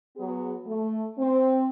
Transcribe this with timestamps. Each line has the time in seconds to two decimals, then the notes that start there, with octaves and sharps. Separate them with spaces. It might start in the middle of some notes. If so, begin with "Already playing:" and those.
0.17 F#3 B3 G#4
0.66 A3
1.19 C4